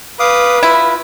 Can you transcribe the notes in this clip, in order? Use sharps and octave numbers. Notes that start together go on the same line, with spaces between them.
B4 F5 D6 D#6
E4 F4